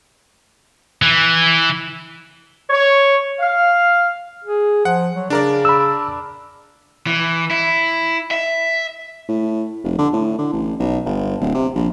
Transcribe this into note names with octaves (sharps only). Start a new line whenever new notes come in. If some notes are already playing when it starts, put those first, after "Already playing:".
E3
C#5
F5
G#4
F3 F#5
F#3
C#3 D4 A#4 D5
B5 E6
E3
E4
E5
A2
F1
D3
A2
D3
A1
B1
G1
D1
C3
A#1